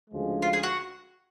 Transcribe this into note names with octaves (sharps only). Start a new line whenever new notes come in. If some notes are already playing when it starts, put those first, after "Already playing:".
D2 C#3 F3 G#3
F4
G#4
F#4